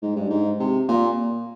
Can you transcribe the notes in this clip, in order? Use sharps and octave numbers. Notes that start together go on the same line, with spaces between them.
G#2
G2
G#2
C3
A#2